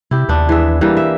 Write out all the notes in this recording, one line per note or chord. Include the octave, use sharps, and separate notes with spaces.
C3 E4 G4
D#2 B3 D4
E3 G#4 E5
E3 G3 A#3
E5